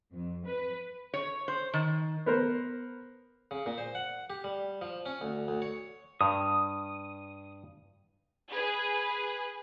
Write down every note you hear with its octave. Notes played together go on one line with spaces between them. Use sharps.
F2
B4
C#5
C5
D#3
B3 A#4 C5
C#3
A#2
C5
F#5
G4
G3
F3
C#4
D2
D2
C#5
G2 D#6
G#4 B4